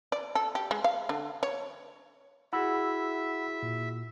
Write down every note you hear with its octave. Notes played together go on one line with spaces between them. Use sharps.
D5
A4
G4
G#3
F5
D3
C#5
E4 F#4 G#4 E5 F#5 B5 E6
A#2